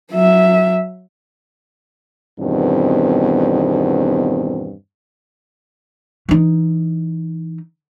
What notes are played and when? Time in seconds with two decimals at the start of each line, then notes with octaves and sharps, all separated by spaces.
0.12 F#3 E5
2.40 E2 G2 B2 D#3 C4
6.29 E3 D#4